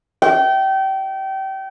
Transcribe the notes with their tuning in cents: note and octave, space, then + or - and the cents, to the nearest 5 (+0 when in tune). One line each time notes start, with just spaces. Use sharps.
G5 -30